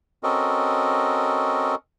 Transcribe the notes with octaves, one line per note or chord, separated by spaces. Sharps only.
C4 C#4 F#4 A4 A#4 D#5